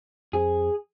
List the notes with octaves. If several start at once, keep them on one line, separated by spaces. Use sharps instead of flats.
F2 G#4